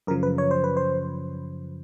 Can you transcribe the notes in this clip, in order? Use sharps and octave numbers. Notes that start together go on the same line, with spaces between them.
F#2 C#3 F3 A#4
B4
C#5
C5
B4
C5